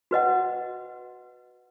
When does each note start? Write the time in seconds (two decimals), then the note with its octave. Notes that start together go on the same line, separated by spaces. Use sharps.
0.11 F#4 B4 D#5 F#5